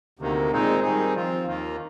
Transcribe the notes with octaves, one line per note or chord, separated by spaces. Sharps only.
D2 C3 D#3 A#3
A#2 G#3 C4 D#4
D#3 G3 C4 D#4 G#4
F3 C4 F4
D#2 D#3 A#3 F4